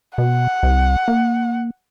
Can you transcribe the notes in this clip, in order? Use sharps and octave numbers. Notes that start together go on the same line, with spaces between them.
B2 F#5
C2
A#3